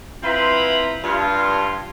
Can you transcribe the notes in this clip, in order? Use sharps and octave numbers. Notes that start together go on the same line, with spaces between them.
C4 E4 F4 B4 A#5 B5
G2 F4